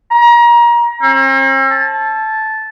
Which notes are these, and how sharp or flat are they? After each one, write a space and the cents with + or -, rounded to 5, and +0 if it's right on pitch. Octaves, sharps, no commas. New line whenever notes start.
A#5 +30
C4 +45
A5 -10